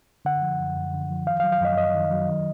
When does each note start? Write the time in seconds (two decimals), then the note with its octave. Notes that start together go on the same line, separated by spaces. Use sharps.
0.25 D3 F#5
0.42 F3
0.59 F#2
0.76 F#2
0.93 D3
1.11 F3
1.27 D#3 F5
1.40 F5
1.44 F#3
1.52 F5
1.61 F#2 D#5
1.78 F#2 D#5
1.95 D#3
2.11 F#3
2.29 D#3